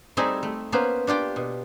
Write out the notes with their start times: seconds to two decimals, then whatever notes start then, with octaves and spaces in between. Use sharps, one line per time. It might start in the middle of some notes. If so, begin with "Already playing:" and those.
0.17 G3 A3 C4 D#4 G#4 E5
0.43 A3
0.72 A#3 B3 C#4 B4 C5
1.07 D4 F4 G4 G5
1.36 B2